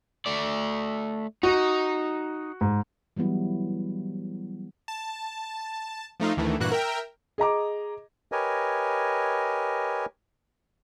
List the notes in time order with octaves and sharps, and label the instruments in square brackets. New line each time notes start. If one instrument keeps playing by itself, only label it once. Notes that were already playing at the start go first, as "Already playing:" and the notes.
[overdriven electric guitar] A3 D5
[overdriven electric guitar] D#4 [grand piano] F#4
[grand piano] G#2
[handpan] E3 F#3 G3 B3 E4
[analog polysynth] A5
F3 A3 D#4 F4
D2 D#3 E3 A3
G2 A#2 E3 F#4 F#6
A#4 E5 G5
[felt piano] G#4 D#5 A#5 D6
[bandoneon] G4 A#4 B4 C#5 D#5 G#5